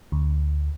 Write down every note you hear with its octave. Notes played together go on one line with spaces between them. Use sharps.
D2